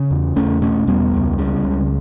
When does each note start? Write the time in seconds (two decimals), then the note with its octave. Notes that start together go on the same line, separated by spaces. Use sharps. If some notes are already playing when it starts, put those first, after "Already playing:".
Already playing: C#3
0.11 E2
0.36 E2 A3 C#4
0.62 B2 A3 C#4
0.87 E2 G3 B3
1.13 C#2
1.38 C#3
1.64 C#2